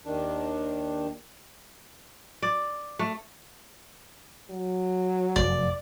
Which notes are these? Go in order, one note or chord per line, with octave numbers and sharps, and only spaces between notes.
D#2 D#3 D4
D5
A3
F#3
F1 F#2 D5